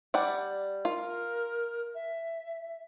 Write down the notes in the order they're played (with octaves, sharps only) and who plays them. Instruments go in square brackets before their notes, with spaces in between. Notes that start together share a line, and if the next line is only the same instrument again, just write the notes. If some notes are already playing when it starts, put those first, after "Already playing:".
[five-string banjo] G3 D5 F#5
[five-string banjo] F4 [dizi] A#4
[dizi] E5